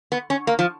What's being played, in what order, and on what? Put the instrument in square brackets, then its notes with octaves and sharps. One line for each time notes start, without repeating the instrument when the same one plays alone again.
[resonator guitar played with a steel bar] B3
C#4
A#3
F3